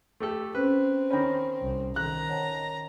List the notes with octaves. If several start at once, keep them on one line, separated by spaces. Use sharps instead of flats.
A3 G4 A4
C4 C#4 B4
D#3 C#4 B5 G6 A#6
C2
D#3 A#5 F#6
C#5 F#5 A5